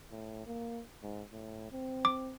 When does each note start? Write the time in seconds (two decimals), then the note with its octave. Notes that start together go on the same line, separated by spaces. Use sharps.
0.11 A2
0.46 A#3
1.03 G#2
1.32 A2
1.71 C4
2.05 D6